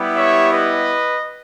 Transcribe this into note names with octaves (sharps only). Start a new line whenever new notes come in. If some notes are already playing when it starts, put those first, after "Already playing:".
Already playing: G3 B3 E4 G4
C#5 E5
B4 D#5